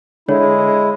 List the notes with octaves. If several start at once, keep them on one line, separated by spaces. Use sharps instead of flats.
D3 G#3 E4 C#5